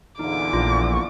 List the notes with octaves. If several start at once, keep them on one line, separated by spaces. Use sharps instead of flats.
E2 A#2 D3 D#4 D6
A#1 F4